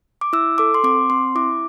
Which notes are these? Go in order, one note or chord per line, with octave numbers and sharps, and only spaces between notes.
D6
E4 E6
A4 D6
C6
C4 D6
C4 C6
E4 D6